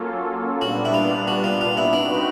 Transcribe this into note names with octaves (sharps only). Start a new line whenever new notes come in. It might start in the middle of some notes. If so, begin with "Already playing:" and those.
Already playing: F#3 A#3 C#4 F4 A4
A#2 G3 B3 D4 F#4
E4
F4
F#4
F4
F4
E4
C4 D4 D#4 F#4 B4